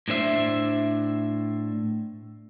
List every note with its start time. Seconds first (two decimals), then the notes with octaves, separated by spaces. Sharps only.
0.08 A2 D4 C5 E5